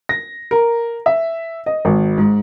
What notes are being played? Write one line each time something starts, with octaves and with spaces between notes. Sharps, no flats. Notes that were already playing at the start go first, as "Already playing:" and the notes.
A#6
A#4
E5
D#5
G#1
G#2